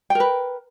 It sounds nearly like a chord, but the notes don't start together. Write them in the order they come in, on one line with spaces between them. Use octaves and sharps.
G5 A#4 B4